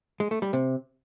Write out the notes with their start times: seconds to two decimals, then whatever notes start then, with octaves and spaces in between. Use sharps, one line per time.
0.20 G#3
0.31 A3
0.42 G3
0.53 C3